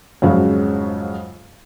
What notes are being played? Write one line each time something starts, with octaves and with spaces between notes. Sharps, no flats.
F2 G#2 C#3 F#3